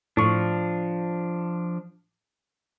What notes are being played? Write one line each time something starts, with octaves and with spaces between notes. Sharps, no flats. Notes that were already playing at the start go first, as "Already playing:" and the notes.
A2 F3 D4 C#6